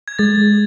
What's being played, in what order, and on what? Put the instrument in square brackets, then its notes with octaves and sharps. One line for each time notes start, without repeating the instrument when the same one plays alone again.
[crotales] G#6
[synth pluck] G#3 [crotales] A6